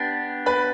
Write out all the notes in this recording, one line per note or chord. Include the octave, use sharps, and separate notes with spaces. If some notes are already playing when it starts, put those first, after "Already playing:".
Already playing: B3 D4 G4
B4 B5